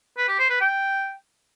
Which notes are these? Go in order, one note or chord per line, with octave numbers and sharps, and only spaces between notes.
B4
G4
C5
B4
G5